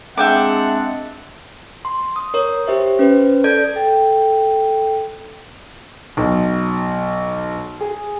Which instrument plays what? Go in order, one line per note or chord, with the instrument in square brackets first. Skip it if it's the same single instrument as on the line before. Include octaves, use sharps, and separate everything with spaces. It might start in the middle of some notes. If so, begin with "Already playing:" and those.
[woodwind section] G#3 C4 D4 [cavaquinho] E5 G5 D6 [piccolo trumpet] F#5
[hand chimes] C6
D#6
A#4 C#5
G4 C5 E5
C#4 B4 C5
A4 D5 G6 G#6 D7
[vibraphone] A4 G5
[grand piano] B1
G#4